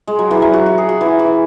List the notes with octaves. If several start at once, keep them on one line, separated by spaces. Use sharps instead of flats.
G#3
F#3
E3
F#3
F#4
F#4
G#4
F#4
E3
E3